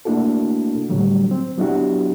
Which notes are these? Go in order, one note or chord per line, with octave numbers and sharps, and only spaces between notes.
A3 A#3 D4 E4 F#4 A4
A2 D3 F#3 G3 A3
C4
F#3 B3 D4 E4 F#4 G4